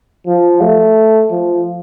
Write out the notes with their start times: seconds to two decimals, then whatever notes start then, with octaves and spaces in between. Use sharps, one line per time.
0.26 F3
0.61 A3
1.31 F3